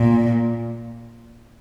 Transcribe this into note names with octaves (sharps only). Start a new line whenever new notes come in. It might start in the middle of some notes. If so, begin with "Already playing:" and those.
Already playing: A#2